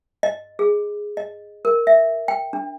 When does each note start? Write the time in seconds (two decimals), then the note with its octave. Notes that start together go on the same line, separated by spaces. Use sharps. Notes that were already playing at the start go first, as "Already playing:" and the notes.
0.23 D#5
0.59 G#4
1.17 D#5
1.65 A#4
1.87 E5
2.28 G5
2.53 D4